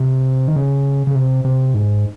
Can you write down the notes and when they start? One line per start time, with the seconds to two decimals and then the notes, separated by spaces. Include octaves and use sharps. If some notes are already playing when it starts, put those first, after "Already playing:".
Already playing: C3
0.48 D#3
0.56 C#3
1.07 C#3
1.15 C3
1.45 C3
1.74 G#2